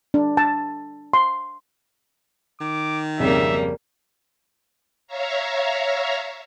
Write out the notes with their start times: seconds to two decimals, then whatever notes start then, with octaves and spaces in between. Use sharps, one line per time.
0.14 D4
0.37 A5
1.14 C6
2.61 D#3 D6
3.20 G#1 F2 C#3 G3 A#3 E5
5.07 C#5 E5 F5 A#5